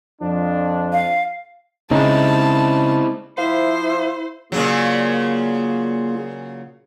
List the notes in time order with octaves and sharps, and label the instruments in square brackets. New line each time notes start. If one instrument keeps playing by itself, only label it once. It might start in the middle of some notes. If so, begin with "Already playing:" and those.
[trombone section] F2 F3 D4
[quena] F5
[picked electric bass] C#3 [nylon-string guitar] G#3 D#4 [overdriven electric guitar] C4 E4 [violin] A5
[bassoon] F3 [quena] E4 [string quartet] C5 [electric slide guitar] E5 F5
[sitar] A#2 C#3 F#3 [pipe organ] A#3 F4 G#4